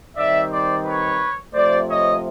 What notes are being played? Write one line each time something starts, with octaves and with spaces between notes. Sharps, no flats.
D#3 G3 C4 D5 E5
C5 D5
B4 C#5
C3 F3 A3 C5 D5
C#5 D#5